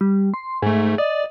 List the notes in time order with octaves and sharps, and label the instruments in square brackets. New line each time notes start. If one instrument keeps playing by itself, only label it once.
[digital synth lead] G3
C6
[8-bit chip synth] G#2 A3 [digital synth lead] G#4
[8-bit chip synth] D5 [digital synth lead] D#5